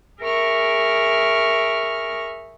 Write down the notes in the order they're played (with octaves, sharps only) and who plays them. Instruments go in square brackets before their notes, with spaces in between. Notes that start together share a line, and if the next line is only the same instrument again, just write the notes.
[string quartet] G#4 A#4 E5 C#6 F6